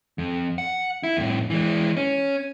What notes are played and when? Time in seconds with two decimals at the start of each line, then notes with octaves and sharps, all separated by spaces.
0.18 F2
0.58 F#5
1.03 E4
1.17 F2 A2
1.50 E3 G#3
1.97 C#4